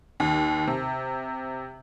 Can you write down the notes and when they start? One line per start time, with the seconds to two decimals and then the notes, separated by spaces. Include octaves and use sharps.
0.20 D#2
0.67 C3